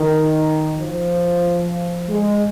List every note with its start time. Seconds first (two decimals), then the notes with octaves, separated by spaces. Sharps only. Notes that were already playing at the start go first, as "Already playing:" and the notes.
Already playing: D#3
0.78 F3
2.09 G#3